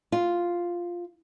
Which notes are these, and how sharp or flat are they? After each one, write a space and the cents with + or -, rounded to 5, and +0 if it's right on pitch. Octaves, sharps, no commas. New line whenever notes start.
F4 +0